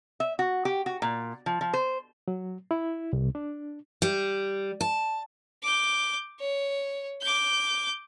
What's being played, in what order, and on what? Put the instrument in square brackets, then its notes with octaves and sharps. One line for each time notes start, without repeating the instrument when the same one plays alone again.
[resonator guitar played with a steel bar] E5
F#4
G4
F#4
A#2
F3
F3
C5
[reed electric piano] F#3
E4
C2
D4
[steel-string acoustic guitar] G3
A5
[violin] D6 G6
C#5
D6 G6